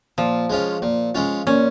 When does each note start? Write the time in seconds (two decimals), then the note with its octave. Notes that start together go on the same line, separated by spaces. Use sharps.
0.18 A#2 F3
0.50 G#3 C#4 F4
0.82 A#2
1.15 G#3 C#4 F4
1.47 A#2 C#4